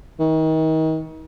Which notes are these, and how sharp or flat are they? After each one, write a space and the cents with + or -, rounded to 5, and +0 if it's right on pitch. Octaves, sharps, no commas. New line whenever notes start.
D#3 +35